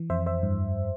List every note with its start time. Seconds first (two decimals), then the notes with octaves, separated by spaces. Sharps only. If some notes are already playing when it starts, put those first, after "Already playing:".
Already playing: E3
0.10 F2 C5 E5
0.26 C5 E5
0.43 G2